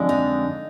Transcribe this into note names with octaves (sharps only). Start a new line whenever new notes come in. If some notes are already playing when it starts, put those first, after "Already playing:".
Already playing: F2 D3 G#3 D4
D#4